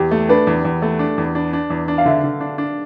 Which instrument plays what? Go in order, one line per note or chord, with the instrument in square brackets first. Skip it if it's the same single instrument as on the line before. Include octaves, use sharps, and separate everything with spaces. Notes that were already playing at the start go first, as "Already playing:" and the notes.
Already playing: [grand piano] E2 [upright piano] G4
[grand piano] A3
[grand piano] D4 [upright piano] B4
[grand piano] E2
E2
A3
D4
E2
D4
D4
E2
D4
[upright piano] F5
[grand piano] D3 [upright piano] E5
[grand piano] D3
D4
D4